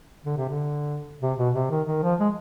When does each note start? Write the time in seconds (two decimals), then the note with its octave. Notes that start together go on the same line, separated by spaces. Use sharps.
0.25 D3
0.37 C3
0.49 D3
1.22 C3
1.38 B2
1.55 C3
1.71 D#3
1.87 D#3
2.03 F3
2.20 G#3